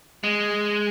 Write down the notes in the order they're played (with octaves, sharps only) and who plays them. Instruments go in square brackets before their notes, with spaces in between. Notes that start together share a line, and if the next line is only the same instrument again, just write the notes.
[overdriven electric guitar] G#3